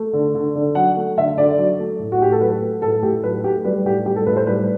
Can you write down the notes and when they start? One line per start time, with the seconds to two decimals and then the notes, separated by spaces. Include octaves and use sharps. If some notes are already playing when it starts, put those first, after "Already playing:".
Already playing: A3
0.13 D3
0.35 D3
0.56 D3
0.75 F#3 F#5
0.97 A3
1.17 D3 E5
1.38 D3 D5
1.58 F#3
1.79 A3
1.99 A2
2.12 F#4
2.20 A2 G4
2.32 A4
2.41 F#3 B4
2.61 A3
2.82 A2 A4
3.02 A2 G4
3.23 F#3 B4
3.44 A3 G4
3.65 G3 B4
3.85 A2 G4
4.06 G3 G4
4.16 A4
4.27 A2 B4
4.36 C5
4.47 G3 B4